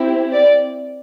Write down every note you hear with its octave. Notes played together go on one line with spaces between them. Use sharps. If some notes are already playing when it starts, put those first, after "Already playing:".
Already playing: C4 E4 G4
D5